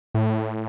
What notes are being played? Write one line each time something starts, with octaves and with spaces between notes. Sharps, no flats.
A2